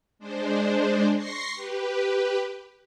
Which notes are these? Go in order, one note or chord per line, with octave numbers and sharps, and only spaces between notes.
G#3 D4 C5
C6 C#6 A#6 C7
G4 B4